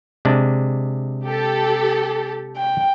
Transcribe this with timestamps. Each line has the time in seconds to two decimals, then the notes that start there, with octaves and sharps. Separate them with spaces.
0.25 C3 G#3 D4
1.24 G4 A4
2.57 G5